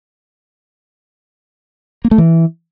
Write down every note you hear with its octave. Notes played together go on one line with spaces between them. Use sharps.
A#3
A3
E3